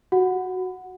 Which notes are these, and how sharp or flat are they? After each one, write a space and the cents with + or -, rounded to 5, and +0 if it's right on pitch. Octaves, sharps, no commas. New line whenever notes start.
F#4 +0 F#5 -5